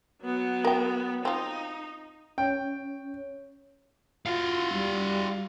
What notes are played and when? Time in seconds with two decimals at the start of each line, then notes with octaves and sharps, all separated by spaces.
0.22 F#3 B3
0.64 A#4 G5
1.25 C4 D#4 F4
2.38 C#4 C#5 G5
4.26 F4 F#4 F5
4.73 G3